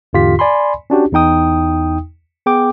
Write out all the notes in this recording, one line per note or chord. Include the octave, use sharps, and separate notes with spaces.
E2 G#2 D3 F4 G4 B6
D5 G#5 B5 C6
C#4 D4 F#4 G4
E2 D#4 G5 D#6
B3 G#4 G5 D6